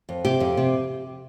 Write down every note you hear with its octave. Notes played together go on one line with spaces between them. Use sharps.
F2
C3 G4
F2
C3